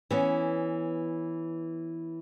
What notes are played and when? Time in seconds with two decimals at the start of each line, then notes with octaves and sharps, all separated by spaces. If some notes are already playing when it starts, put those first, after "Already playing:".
0.11 E3 B3 C#4